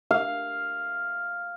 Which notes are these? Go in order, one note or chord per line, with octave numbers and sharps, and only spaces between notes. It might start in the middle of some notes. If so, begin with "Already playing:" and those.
F5